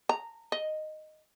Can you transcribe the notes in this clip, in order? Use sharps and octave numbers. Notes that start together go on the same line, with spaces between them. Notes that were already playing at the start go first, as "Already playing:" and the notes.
A#5
D#5